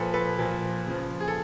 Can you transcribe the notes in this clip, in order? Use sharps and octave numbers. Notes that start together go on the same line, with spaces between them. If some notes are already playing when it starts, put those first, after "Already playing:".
Already playing: A#2 F3 A4 B4
A4 B4
A#2 F3
C#3 F3
G#4
A4